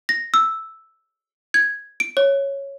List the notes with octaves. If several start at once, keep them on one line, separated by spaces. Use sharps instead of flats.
A#6
E6
G#6
D7
C#5